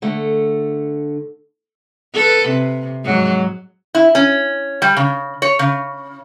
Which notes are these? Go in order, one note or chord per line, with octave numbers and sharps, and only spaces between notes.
D3 A3
A4 B4
C3
G#2 F#3
E4
C#4
G3
C#3
C#5
C#3